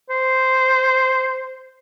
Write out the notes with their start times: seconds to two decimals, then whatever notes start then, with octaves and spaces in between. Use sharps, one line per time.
0.10 C5